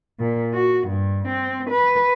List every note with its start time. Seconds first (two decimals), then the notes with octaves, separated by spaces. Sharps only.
0.19 A#2
0.54 F#4
0.87 G2
1.28 C4
1.70 B4